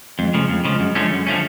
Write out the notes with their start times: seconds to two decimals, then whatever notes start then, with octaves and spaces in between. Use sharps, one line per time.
0.19 F2 G#3
0.34 C#3 F3 A3
0.49 F2 G#3
0.65 C#3 F3
0.80 F#2
0.95 D3 F3 A3 C#4
1.11 F#2
1.27 D3 F3 A3 C#4